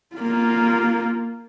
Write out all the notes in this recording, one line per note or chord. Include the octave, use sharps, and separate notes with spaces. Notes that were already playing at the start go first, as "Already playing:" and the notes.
A#3 F4